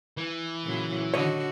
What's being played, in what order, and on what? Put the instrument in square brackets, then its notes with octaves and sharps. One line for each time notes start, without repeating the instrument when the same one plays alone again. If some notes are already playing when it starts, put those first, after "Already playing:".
[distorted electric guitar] E3
[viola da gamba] A#2 C#3 F#3
[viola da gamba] D3 F#4 [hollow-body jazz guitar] C#5 D#5